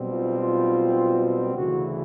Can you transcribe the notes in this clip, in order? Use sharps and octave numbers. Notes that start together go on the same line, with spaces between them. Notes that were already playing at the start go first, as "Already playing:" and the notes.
Already playing: B1 B2 G3 C4
F4
F4
D2 C#3 E3 F#4